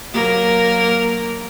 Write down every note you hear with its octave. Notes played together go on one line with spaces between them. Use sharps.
F#3 A#3 A#4